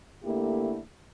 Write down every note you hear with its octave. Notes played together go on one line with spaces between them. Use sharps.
D3 A3 A#3 E4 G4